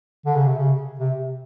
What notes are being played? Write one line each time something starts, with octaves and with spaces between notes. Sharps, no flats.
D3
C#3
C3
C#3
C3